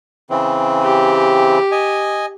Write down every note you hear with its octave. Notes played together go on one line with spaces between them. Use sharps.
C#3 E3 C4
G4
D#5 G#5